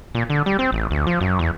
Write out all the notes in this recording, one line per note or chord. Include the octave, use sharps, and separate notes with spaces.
A#2
D3
G3
C4
A1
D2
F3
F#2
E2